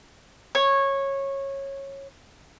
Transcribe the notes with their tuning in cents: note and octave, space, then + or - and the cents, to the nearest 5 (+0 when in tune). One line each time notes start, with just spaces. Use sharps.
C#5 -15